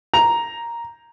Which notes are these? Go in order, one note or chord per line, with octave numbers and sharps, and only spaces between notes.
A#5 F7